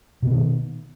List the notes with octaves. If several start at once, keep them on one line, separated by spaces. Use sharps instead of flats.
B2 D#3 B3